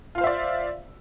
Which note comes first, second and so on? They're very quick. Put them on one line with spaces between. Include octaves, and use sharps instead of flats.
F4 F5 C5 E5 D5